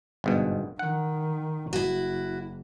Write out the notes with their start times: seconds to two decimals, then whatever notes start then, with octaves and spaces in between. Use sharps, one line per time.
0.24 G1 G#2 B2
0.79 D#3 F#5
1.73 F#1 E4 F#4